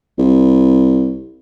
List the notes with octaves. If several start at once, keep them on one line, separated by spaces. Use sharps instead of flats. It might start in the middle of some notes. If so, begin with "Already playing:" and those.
C2